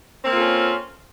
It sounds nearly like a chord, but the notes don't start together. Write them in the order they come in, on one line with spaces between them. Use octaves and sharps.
C4 A#3 F4 A4 C#4